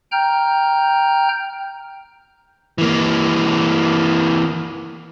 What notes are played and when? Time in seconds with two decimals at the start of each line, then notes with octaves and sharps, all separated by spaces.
0.12 G5 A#5 F6 G6
2.78 E3 A#3